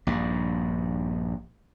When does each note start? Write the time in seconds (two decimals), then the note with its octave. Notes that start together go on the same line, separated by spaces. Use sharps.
0.07 A#1 G2